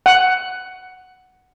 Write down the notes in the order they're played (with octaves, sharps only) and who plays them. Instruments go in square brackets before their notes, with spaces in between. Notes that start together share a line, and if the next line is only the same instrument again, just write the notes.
[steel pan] F#5